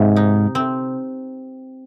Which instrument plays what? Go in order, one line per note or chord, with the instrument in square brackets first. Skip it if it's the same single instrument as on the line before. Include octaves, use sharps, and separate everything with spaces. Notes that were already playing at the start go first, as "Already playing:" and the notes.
Already playing: [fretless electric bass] G#2 [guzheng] C3
[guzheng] D#4
C4